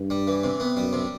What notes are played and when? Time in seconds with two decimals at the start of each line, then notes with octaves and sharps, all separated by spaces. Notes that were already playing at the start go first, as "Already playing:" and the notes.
Already playing: G2
0.10 G3
0.27 E3
0.44 C3
0.60 B3
0.76 F#2 G3
0.93 C3